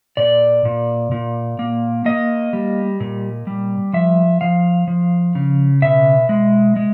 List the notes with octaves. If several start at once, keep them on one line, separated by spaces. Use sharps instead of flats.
A#2 D5
A#2
A#2
A#3
A#3 D#5
G3
A#2
G3
F3 E5
F3 F5
F3
C#3
B2 E5
G#3
G#3